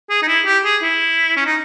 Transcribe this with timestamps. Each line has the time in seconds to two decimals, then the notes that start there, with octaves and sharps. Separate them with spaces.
0.10 G#4
0.23 D#4
0.28 E4
0.46 G4
0.64 G#4
0.83 E4
1.37 C#4
1.46 D#4